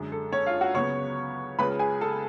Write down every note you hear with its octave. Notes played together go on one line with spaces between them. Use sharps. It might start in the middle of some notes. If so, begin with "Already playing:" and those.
Already playing: F#2 D3 G#3
A4
C#4 C#5
F4 F5
F#4 F#5
C#2 C#3 F#3 B3 C#5 C#6
C#2 C#3 G#3 C#4 F4 B4 B5
G#4 G#5
A4 A5